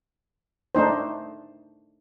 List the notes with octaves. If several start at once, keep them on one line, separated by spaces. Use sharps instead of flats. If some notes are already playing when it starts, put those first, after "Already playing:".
A3 D4 D#4 C5